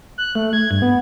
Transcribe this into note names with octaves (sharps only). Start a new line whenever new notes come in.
F#6
A3
G#6
G2
B3